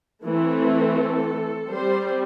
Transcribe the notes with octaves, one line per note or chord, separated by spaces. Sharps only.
E3 A3 C4 E4
A4
G3 C4 C5